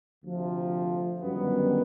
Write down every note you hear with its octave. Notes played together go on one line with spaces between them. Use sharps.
D2 C3 F3
G1 F#2 D#3 G3 B3